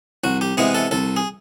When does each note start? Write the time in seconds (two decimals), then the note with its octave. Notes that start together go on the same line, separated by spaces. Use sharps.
0.24 C2 F#4
0.41 G4
0.57 C3 E3 G#3 B3 G#4
0.75 A4
0.91 C2 A4
1.16 G#4